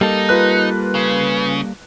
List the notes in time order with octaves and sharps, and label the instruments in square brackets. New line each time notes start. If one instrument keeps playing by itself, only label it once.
[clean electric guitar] G3 A#3 A4 [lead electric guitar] D#4
[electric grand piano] F4 B4 F#6
[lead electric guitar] C#3